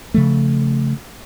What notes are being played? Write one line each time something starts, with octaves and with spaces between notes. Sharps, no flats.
C#3 F3 A3